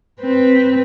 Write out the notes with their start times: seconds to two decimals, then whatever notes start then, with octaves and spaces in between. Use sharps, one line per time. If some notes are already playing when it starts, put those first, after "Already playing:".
0.21 C4 B4